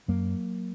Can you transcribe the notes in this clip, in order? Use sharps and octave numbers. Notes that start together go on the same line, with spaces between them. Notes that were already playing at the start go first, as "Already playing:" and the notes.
F#2 F#3 A#3